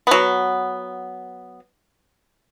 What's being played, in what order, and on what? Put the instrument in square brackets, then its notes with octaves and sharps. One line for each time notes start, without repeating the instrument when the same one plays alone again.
[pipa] F#3 B3